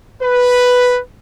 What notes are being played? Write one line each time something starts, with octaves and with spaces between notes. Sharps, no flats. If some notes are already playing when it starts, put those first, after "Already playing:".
B4